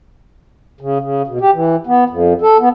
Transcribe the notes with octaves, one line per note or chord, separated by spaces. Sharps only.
C#3
C#3
B2
G4
E3
B3
F2
A4
B3